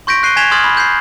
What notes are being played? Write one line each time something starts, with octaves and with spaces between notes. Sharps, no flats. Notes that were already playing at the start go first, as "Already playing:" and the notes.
C6 C#6 G6 A#6 B6 D7
F#6 C7 D#7 G7
G#5 G#6 B6 E7 F7 G7
C6 D#6 F6 G#6 A6 F#7
B5
G6 C7